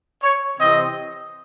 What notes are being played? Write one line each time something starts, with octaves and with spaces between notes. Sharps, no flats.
C#5
C3 E3 C4 D#5